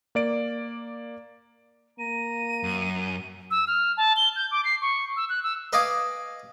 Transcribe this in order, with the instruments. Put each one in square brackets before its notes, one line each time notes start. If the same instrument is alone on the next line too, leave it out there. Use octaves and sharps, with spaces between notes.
[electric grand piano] A#3 D5 D7
[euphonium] A#3 [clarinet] A#5 [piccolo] D#7
[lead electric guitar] F#2
[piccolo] E6
F6
A5
G7
G6
D6
C7
C#6
E6
F#6
E6
[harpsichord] B4 D#5 F5 G#5 D6 D#6